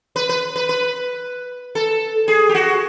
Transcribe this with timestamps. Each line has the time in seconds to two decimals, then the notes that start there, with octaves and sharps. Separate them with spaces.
0.16 B4
0.29 B4
0.56 B4
0.69 B4
1.75 A4
2.28 G#4
2.49 G4
2.55 F#4